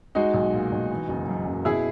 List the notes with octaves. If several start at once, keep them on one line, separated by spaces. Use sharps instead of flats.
G#3 D#4 F#4
B1
A#2
B1
E3
F#1
F#2
F#1
B2 E4 G#4